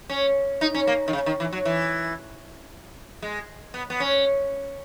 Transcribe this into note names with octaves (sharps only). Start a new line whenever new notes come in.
C#4
D#4
C#4
A#3
D#3
C#3
D#3
E3
F#3
E3
G#3
B3
B3
C#4